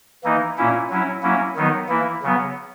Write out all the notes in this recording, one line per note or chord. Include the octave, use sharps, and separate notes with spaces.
E3 A#3 D#4
A#2 A#3 C#4 E4
F#3 C#4 E4
F#3 A#3 C#4 E4
D#3 F#3 B3 D#4
E3 A#3 E4
C#3 F#3 B3